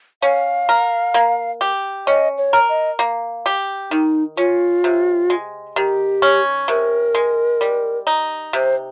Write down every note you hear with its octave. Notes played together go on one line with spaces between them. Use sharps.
C#4 F5
A#4
A#3
G4
C#4 D#5
C#5
A#4
D#5
A#3
G4
D#3 D#4
C#4 F4
C3
G#3
D#3 G4
C#4
C3 A#4
G#3
G3
D#4
C3 C5